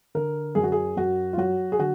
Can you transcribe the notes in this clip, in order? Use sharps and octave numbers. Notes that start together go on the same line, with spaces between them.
D3 A#4
F#2 G#4
F#4
G#4
F#2 F#4
F4
F#3 F#4
G#4
D3 F#4